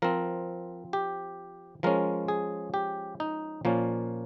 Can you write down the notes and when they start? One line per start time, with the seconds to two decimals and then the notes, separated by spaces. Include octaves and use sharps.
0.02 F3 C4 A#4
0.93 G4
1.83 F3 G#3 C#4 A#4
2.28 G#4
2.74 G4
3.20 D#4
3.65 A#2 F3 A#3 C#4